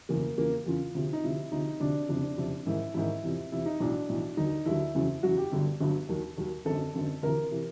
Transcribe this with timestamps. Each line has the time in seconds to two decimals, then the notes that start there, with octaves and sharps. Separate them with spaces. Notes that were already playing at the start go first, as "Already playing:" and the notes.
0.09 F#1 E2 B2 F#3 A#3
0.38 E2 C#3 F3 A#3
0.66 E2 C#3 F3 F4
0.95 D2 C3 F3
1.13 D#4
1.24 D2 C3 F3 E4
1.52 D2 C3 F3 D#4
1.80 D2 C3 F3 D4
2.09 F#1 F2 C3 D4
2.38 F#1 F2 C3
2.66 A1 G#2 D#3 E4
2.94 A1 G#2 D#3 E4
3.23 E2 C3 F3
3.52 E2 C3 F3 E4
3.66 D#4
3.80 B1 A2 E3 D4
4.09 B1 A2 E3
4.37 D#2 D3 F#3 D#4
4.66 D#2 D3 F#3 E4
4.95 F#1 E2 C#3 F#3
5.23 F#1 E2 C#3 F#3 F#4
5.38 G4
5.52 G1 G2 D3 F#3
5.80 G1 G2 D3 F#3
6.09 D#2 D#3 F#3
6.38 D#2 D#3 F#3
6.65 G#1 F#2 D3 A4
6.95 G#1 F#2 D3
7.22 D2 C3 E3 A#4
7.51 C3 E3